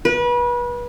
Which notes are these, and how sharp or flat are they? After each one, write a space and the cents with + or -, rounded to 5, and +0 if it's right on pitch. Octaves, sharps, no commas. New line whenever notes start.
B4 -30